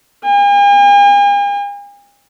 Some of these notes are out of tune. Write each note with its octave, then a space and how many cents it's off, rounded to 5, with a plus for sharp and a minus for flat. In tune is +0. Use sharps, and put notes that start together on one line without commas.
G#5 -45